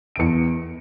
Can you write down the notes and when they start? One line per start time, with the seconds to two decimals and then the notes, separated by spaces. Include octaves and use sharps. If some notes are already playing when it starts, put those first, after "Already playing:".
0.16 D7
0.19 E2 C#7